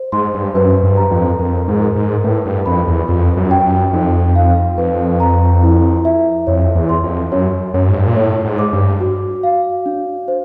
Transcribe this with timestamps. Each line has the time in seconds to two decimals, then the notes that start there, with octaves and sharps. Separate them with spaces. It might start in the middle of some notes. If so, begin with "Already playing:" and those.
Already playing: C5
0.12 G#2 C6
0.34 G2
0.54 F#2 B4
0.83 G2
0.97 A#5
1.11 F2
1.39 F2 A#4
1.68 G#2
1.82 A#4
1.96 G#2
2.24 A2 B4
2.45 G2
2.66 F2 B5
2.87 E2
3.08 F2 F4
3.37 F#2
3.51 G5
3.65 F#2
3.93 F2 D#4
4.36 F5
4.78 F2 B4
5.20 A#5
5.63 E4
6.05 E5
6.47 F2 C#5
6.75 E2
6.89 C6
7.03 F2
7.32 F#2 C#5
7.74 F#2 C#5
7.89 G#2
7.95 G2
8.07 A#2
8.16 A2 C#5
8.44 G#2
8.58 D6
8.73 G2
9.00 F#4
9.43 F5
9.86 D4
10.28 C5